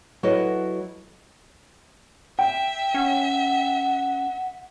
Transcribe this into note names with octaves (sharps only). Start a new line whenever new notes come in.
F#3 E4 F#4 A4 B4 D#5
E5 G5
C#4 F#5